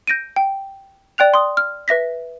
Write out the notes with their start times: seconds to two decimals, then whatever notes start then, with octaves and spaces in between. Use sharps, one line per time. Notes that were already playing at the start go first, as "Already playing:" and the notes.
0.07 G6 A#6 D7 D#7
0.36 G5
1.18 D5 G5 F#6 F7
1.34 C6 D#6
1.57 F6
1.88 B4 E5 A#6 B6